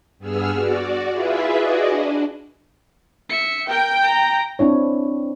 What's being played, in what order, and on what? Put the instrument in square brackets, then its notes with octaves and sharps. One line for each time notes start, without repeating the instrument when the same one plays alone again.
[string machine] G2 B3 G#4 E6 F6
F#4 D5
E4 F4 G#4 B4 E5
F#4 G#4 D5 D#5
D4
[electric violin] E5 C#7
[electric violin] A#4 [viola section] G5
[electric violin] A#5
[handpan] C4 D4 E4 C#5